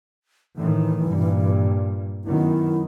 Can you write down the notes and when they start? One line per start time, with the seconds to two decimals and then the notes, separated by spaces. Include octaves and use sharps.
0.56 A2 D#3 E3
1.07 G2 A#2
2.24 F#2 D#3 B3 E4